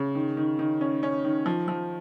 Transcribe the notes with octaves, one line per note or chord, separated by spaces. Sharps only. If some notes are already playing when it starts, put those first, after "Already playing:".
Already playing: C#3
D#3
D#3
D#3
C#4
C#4
D#3
F3
F3